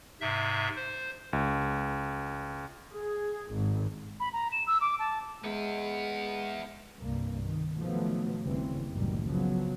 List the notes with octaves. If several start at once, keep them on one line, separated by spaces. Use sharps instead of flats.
G#2 C3 E5
C5
C#2
G#4
G#1
B5
A#5
E7
E6
D6
A5
G#3 B3 E4
C2 G2 A#3
D#3
B2 D#3 F3 F#3 A3 B3
F#1 D#2 C#3 E3 G3 C4
F#1 C2 F#2 A2 D#3 G3
C#3 F3 F#3 B3